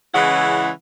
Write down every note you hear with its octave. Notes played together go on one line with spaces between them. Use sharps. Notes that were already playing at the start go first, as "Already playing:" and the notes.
C#3 E3 G#3 C#4 E4 F#5